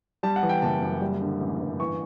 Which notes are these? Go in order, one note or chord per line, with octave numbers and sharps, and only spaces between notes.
G3 A5
F#5
E3
G5
F#1 A5
F#2
G3
D3
A1
G2
E3 C#6